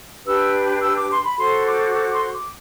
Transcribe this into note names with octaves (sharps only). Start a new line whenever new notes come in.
D4 G4 B4 E6
E6
D6
C6
B5
F#4 A4 C5 C6
D6
D6
C6
D6